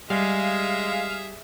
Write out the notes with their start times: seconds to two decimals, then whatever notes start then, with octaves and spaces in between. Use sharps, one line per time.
0.10 G3 G#3 G#4 E5 F5